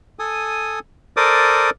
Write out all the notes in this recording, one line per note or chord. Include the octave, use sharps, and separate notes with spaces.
A4 G#5 D#6
A4 A#4 C5 D5 D6 D#6